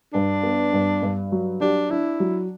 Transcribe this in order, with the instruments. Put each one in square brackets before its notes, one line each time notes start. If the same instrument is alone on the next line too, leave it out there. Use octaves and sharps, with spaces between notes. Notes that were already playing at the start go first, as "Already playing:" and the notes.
[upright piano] G2 [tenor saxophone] D4
[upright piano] B3
G2
G2
F#3
[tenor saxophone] D4 [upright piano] G4
[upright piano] D4 [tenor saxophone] E4
[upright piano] F#3